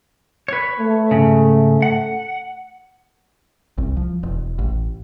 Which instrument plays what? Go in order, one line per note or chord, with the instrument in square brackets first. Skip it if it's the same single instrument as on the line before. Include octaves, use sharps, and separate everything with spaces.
[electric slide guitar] B4 C#5
[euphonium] A3
[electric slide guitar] G#2 C#3
F#5
[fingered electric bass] C2
F3
E1
A1